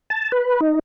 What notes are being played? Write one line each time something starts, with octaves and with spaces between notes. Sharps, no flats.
A5
B4
D#4